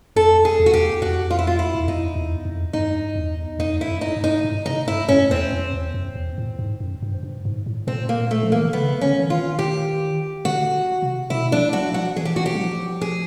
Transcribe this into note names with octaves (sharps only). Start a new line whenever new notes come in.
F2 A4
G#4
E2
F#4
G4
F2 F#4
F4
E4
F4
E4
E2
F2 D#4
E2
F2
G2 D#4
E2
F2 D#4
E4
F#2
D#4
G2
D#4
G#2
C3 D#4
G2 E4
F#2 C#4
E2 C4
F2
E2
F#2
E2
A2
G#2
F#2
G2
G2
G#2
A2
A#2 C4
A#3
A3
F3
E3 A#3
D#3
D3
C#3 B3
D3 C#4
E3
D#3 F4
G4
D3 F#4
C3
B2 E4
F3 D4
F#3 F#4
F3 F#4
E3 G#4
G4
F#4
G4
F#3
F3
G#4